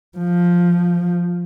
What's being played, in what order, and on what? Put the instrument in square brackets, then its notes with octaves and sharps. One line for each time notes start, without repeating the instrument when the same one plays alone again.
[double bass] F3